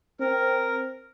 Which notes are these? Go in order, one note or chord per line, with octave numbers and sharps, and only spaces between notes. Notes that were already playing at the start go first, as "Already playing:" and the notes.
C4 A#4